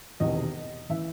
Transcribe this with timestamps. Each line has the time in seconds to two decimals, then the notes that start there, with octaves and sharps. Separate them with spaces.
0.20 E1 E2 C3 D#3 D#5
0.90 E3 E5